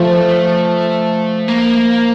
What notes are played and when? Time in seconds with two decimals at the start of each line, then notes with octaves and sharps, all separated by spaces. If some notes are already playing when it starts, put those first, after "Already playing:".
Already playing: F3 A3
1.48 A#3